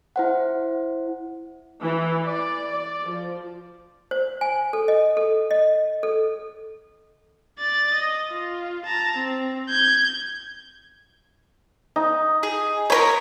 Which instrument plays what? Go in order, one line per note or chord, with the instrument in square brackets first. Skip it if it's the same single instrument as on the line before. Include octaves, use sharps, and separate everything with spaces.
[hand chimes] E4 C5 F#5
[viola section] E3
D5
D5
F3
[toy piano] C5
G#5
A4
D#5
A4
D#5
A4
[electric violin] D5 A6
D#5
F4
A5 A#5
C4
G6 G#6
[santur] D#4
[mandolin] G#4
[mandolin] A#4 B4 C#5 [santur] C6